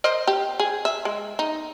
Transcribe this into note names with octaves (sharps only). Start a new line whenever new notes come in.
A#4 C5 D#5
G4
G#4
E5
G#3
D#4